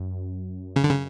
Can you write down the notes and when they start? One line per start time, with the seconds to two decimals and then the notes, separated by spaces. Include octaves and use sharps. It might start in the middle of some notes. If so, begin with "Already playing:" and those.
Already playing: F#2
0.76 C#3
0.84 D3
0.90 C#3